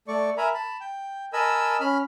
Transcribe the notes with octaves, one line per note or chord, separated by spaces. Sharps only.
A3 D5 C#6
A#4 E5 G#5 A#5 B5
A5 B5
G5
A#4 D#5 G#5 A5 B5 E6
C#4 B5 F6